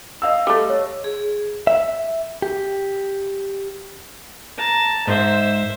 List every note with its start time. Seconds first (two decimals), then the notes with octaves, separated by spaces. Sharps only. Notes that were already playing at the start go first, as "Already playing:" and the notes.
0.22 D#5 F5 E6
0.47 G3 A3
0.70 C#5
1.04 G#4
1.67 E5
2.42 G4
4.57 A5 A#5
5.07 G#2 C5 E5